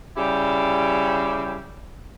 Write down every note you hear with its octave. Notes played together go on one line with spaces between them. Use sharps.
C#3 G3 E4 G4